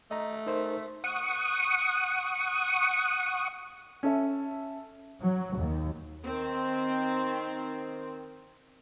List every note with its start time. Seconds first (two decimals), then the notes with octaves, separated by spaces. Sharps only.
0.11 A3 D#5 A#5
0.47 D#4 A#4 C5
1.04 F#5 C#6 D#6
4.03 C#4 A4 E5
5.20 F#3
5.56 D#2
6.25 D#3 C4